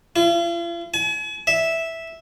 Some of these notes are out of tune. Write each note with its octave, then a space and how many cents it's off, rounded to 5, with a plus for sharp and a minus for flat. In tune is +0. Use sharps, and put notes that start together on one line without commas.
F4 -45
G#5 +40
E5 -5